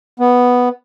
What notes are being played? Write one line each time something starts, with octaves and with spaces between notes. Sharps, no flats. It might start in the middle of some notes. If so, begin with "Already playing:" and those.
B3